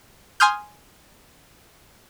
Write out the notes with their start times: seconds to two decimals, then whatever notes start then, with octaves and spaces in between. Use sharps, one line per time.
0.40 G#5 C6 D#6 F6 G6